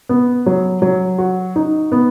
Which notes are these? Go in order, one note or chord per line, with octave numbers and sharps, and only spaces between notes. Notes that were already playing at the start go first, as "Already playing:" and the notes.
B3
F#3
F#3
F#4
D#4
B3